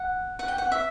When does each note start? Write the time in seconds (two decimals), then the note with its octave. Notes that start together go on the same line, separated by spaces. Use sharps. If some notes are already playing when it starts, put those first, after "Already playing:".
Already playing: F#5
0.39 F#5
0.48 G5
0.58 F#5
0.72 E5